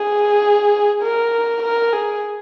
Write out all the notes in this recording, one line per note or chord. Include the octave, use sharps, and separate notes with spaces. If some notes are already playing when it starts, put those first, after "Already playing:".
Already playing: G#4
A#4
A#4
G#4